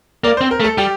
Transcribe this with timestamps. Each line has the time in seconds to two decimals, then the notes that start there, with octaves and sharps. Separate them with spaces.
0.24 A#3 D5
0.37 C4 C5
0.51 A#4
0.60 A3
0.64 A4
0.78 G3 G4